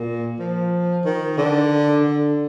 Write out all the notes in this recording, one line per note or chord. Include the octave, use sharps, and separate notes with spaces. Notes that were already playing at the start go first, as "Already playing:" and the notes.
Already playing: A#2
F3
D#3
D3
D3